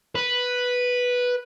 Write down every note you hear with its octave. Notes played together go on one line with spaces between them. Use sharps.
B4